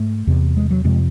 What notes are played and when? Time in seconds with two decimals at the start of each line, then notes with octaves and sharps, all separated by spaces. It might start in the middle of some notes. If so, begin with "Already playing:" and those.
Already playing: G#2 A3
0.27 E2 C3
0.57 G#3
0.71 F#3
0.84 F2 C3 G#3